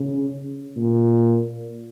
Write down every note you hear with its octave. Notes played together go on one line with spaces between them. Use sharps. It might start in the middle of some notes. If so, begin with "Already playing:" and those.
Already playing: C#3
A#2